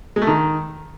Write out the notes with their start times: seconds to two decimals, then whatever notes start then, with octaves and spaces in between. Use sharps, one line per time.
0.16 G#3
0.22 A3
0.27 D#3